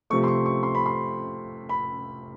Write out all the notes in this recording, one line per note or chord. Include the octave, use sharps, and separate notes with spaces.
C3 F3 A3 C#6
C6
C#6
C#6
C6
B5
C6
B5